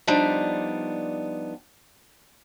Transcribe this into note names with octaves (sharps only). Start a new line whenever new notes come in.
F3 G3 B3 D4 D#4